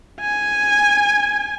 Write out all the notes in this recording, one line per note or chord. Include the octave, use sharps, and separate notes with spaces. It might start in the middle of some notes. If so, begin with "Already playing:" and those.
G#5